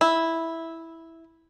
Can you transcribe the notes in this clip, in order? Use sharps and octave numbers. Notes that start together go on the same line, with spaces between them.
E4